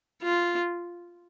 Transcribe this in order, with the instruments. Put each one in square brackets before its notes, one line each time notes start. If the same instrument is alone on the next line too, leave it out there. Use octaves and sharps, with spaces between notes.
[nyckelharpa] F4